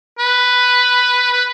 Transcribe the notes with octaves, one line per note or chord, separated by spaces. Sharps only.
B4
B4